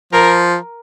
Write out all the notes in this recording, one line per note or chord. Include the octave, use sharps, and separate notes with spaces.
F3 A#4